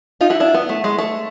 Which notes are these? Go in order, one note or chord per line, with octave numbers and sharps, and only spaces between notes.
D#4 F4
E4 F#4
D4 E4
B3
A3
G#3
A3